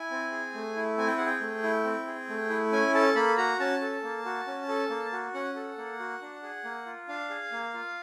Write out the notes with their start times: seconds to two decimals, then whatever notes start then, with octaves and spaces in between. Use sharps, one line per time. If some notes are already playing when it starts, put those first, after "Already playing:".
Already playing: E4 G#5
0.11 C4
0.32 G#4
0.54 A3
0.76 E4
0.97 C4 G#5
1.08 G5
1.17 G#4 F#5
1.26 G5
1.41 A3
1.63 E4
1.85 C4
2.07 G#4
2.29 A3
2.50 E4
2.72 C#4 G#5
2.94 A4 A5
3.16 A#3 B5
3.38 F#4 A#5
3.60 C#4 A5
3.81 A4
4.03 A#3
4.25 F#4
4.47 C#4
4.68 A4
4.90 A#3
5.12 F#4
5.34 C#4 F#5
5.55 A4
5.78 A#3
6.00 F#4
6.21 D4
6.43 G#4
6.65 A#3
6.86 F4
7.08 D4 F5
7.30 G#4
7.52 A#3
7.74 F4